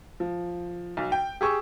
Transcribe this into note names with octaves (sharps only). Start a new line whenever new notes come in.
F3
B1
G5
G4 G#4 C#6 E6